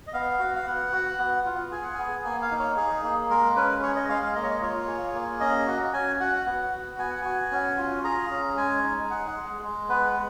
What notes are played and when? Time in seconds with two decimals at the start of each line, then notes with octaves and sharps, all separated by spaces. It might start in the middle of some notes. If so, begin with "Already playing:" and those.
0.07 D#5
0.14 B3 F5
0.39 F#4
0.56 F5
0.66 B3 F#5
0.92 F#4
1.19 B3
1.45 F4
1.72 G#4 G#5
1.83 F#5
1.94 B3 G#5
2.24 A#3 G#5
2.42 F5
2.51 D#4
2.59 C#5
2.77 G#4
3.03 A#3
3.30 G#3 A#4
3.56 C#4 B4
3.82 G#4 C#5
3.96 D#5
4.09 G#3 F5
4.22 F5
4.35 A#3 D#5
4.43 C#5
4.51 D#5
4.62 F4 C#5
4.88 G#4
5.14 A#3
5.40 C#4 D#5
5.67 F#4
5.93 C#4 G#5
6.20 F#4 F#5
6.46 B3
6.73 F#4
6.98 B3 G#5
7.10 F#5
7.22 F#4 G#5
7.51 C#4
7.78 F4
8.04 G#4 A#5
8.31 C#4
8.57 G#3 G#5
8.83 D#4
9.10 G#4 F#5
9.27 F#5
9.36 G#3
9.63 G#3
9.89 B3 B4